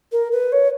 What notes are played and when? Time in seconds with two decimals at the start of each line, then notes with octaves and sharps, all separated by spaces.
0.12 A#4
0.32 B4
0.52 C#5